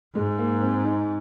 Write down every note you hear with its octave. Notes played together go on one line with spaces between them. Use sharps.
G#2 G#3
A#3
C4
D#4